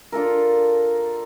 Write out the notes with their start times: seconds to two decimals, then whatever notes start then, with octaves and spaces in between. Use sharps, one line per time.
0.12 D4 F4 A4 A#4